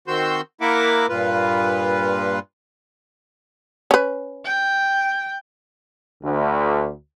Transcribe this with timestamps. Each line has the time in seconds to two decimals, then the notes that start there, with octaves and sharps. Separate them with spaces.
0.08 D#3 C4 F#4 C6 E6 G6
0.61 A#3 E4 A#4 E5 F#5 D6
1.09 G2 A#2 F4 B4
3.91 C#4 B4
4.45 G5
6.23 D2